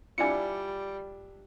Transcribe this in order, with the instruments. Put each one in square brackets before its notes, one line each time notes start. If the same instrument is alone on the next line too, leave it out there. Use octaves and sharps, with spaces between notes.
[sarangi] G3 [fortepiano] D4 E4 F4 [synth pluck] G#5 C#7